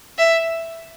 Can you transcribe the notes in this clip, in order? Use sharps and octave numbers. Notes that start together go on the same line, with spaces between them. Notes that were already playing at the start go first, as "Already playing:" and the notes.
E5